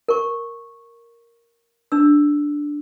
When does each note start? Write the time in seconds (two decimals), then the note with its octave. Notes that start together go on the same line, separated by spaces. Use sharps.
0.09 A#4 C#6
1.92 D4 E6